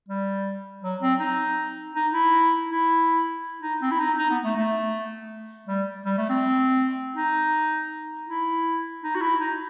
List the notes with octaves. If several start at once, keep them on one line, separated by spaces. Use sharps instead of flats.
G3
F#3
C4
D#4
D#4
E4
E4
D#4
C4
E4
D#4
D#4
B3
A3
A3
G3
G3
A3
C4
D#4
E4
D#4
F#4
E4
D#4